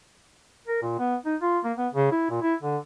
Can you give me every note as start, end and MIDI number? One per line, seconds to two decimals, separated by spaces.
0.68 0.79 70
0.82 0.95 46
0.99 1.16 59
1.25 1.36 63
1.41 1.59 65
1.64 1.72 58
1.78 1.88 59
1.94 2.08 49
2.12 2.28 64
2.30 2.40 46
2.42 2.54 64
2.62 2.77 50